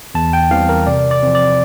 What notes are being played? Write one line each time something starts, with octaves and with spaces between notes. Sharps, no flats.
E2 A5
G5
E3 G3 C4 F5
A#4
C3 D5
D5
F3 C4
D5